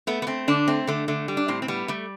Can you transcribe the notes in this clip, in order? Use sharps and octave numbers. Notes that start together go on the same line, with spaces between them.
A3 B3
B3
A3 C4
D3 D4
A3 C4
D3 A3
D3 A3
G3
D4
A2 C4
C4
G3 B3
G3 A3